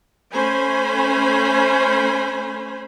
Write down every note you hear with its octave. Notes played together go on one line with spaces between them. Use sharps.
A3 C#4 C5 G#5 B5